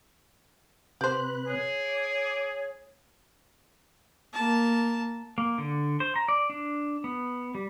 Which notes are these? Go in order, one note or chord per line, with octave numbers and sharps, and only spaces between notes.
C3 G4 B4 C5 F#6
G#4 C#5
D6
A#3 A5
A#3
D3
C5
A#5
D5
D4
B3
G3